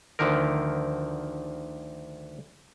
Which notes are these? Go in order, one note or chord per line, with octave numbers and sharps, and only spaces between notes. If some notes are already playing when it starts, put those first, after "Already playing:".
D2 D3 D#3 F3 A#4